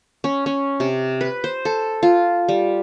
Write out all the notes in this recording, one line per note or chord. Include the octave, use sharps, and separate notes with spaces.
C#4
C#4
C3
B4
C5
A4
F4
G3